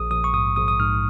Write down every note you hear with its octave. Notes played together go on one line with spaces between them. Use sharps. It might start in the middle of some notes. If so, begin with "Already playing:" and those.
Already playing: A#1 D#6
A#1 D#6
C#6
G#2 D#6
A#1 D#6
D#6
G#2 F6